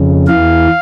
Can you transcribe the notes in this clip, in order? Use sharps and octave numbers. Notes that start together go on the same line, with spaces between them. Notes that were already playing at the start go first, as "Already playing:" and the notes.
Already playing: F2 C#3
E2 E3 F5